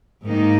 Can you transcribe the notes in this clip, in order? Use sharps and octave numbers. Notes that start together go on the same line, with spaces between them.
G#2 D#3 A#3 D#4